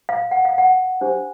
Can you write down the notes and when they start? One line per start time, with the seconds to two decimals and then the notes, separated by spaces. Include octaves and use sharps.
0.09 F5
0.31 F#5
0.45 F5
0.58 F#5
1.01 D4 G4 C5